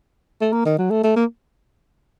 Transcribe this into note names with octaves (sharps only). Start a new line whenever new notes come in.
A3
A#3
D#3
F#3
A3
A3
A#3